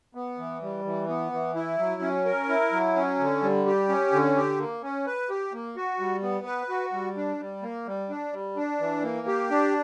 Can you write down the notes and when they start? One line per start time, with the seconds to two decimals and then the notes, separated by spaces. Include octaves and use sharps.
0.15 B3
0.38 E3
0.62 G3
0.85 E3
1.09 B3
1.33 E3
1.55 E4
1.78 F#3
2.02 C#4
2.25 A#4
2.49 E4
2.72 F#3
2.96 C#4
3.20 D3
3.42 G3
3.66 G4
3.89 C#4
4.13 D3
4.36 G4
4.59 A#3
4.83 C#4
5.06 B4
5.30 G4
5.53 A#3
5.76 F#4
6.00 G3
6.22 B3
6.46 B4
6.69 F#4
6.92 G3
7.17 D4
7.40 G3
7.63 A#3
7.87 G3
8.10 D4
8.33 G3
8.57 D4
8.80 E3
9.03 A#3
9.27 G4
9.51 D4